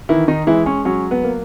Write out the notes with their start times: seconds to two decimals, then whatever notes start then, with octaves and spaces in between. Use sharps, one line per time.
0.09 D#3 E3 E4
0.28 D#3 D#4
0.47 E3 G#3 E4
0.66 C#4
0.85 F#3 C#4
1.11 B3
1.24 A#3